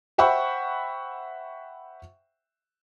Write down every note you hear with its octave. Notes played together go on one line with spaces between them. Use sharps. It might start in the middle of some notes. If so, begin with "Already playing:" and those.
C5 E5 F#5 G5 B5 C#6